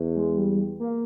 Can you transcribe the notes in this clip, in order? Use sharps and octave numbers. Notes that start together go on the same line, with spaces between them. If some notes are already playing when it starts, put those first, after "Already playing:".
Already playing: E2
G#3
G3
A#3